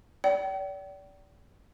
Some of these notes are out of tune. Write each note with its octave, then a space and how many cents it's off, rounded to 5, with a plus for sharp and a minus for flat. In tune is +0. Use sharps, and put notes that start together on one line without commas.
D5 -30 G5 -35